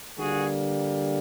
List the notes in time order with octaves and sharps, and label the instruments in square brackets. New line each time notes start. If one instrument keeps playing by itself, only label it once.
[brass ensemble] D3 G3 A#3 F#4 G#4